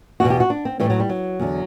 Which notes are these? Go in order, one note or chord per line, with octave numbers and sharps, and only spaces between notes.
E2 B2 F#4
G4
F#4
D4
C4
A2 E3 G3
F#3
G3
F#3
E2 D3